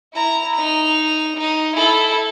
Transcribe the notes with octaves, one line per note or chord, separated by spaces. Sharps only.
E4 A#5
D#4 F7
D#4
E4 A4